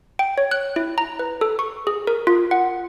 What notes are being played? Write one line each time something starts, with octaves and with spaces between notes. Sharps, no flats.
G5
C#5
F#6
E4
A#5
B4
A4
C#6
G#4
A#4
F4
F#5